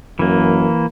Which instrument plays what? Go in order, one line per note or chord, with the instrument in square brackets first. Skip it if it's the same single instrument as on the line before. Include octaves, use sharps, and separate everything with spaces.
[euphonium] F#2 [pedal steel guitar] E3 A#3